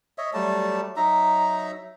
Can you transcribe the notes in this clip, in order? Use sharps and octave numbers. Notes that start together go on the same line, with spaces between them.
C#5 D#5 E5
F#3 G3 A3 A5
F#3 D#4 E5 A#5